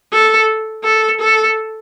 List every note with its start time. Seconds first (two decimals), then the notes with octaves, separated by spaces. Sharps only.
0.13 A4
0.84 A4
1.20 A4